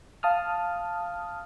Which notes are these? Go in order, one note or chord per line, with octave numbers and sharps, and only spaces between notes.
F5 A5 D#6 F6